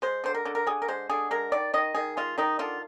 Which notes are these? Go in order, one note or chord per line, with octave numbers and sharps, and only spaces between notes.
G#3 C5
D3 C5
A#4
D3
A#4
D3 G#4
A#4
G#3 C5
D3 G#4
G#3 A#4
D#3 D5
D#3 D#5
D#3 G#4
G#3 F4
D#3 D#4
D3 F4